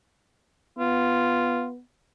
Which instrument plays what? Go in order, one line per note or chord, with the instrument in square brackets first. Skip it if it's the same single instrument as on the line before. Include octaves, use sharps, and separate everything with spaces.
[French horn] B3 [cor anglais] F4